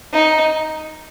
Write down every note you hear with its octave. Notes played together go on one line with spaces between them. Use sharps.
D#4